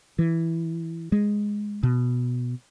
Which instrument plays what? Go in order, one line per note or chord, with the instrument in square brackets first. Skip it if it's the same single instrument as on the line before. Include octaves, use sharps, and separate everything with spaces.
[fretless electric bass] E3
G#3
B2